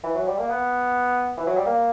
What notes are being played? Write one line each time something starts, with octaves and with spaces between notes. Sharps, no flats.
E3
F#3
G3
A#3
B3
E3
F#3
G3
A#3